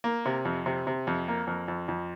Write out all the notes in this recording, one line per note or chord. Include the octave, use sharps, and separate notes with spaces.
A#3
C3
F2
C3
C3
F2
A#3
F2
F2
F2